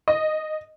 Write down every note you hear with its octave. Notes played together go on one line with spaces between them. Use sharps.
D#5